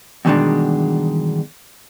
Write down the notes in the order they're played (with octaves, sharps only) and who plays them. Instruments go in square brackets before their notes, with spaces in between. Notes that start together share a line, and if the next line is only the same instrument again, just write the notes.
[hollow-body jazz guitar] E2 G2 B2 D#3 G#3 D4